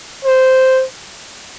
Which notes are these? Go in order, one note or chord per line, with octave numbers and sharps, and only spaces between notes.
C5